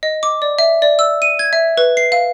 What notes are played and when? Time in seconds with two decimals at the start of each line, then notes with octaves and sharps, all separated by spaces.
0.03 D#5
0.23 D6
0.42 D5
0.59 E5
0.82 D5
0.99 E6
1.22 D#7
1.39 G#6
1.53 E5
1.77 B4
1.97 C7
2.12 F5